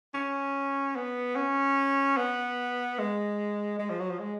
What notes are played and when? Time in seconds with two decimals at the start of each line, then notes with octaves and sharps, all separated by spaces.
0.14 C#4
0.96 B3
1.36 C#4
2.17 B3
2.99 G#3
3.79 G#3
3.89 F3
4.00 F#3
4.10 F3
4.20 G#3